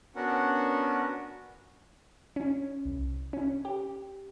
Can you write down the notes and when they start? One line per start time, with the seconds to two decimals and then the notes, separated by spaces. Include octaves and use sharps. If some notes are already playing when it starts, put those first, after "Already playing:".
0.16 B3 C#4 D4 F#4 A#4 F#5
2.36 C#4
2.85 C2
3.33 C#4
3.65 G4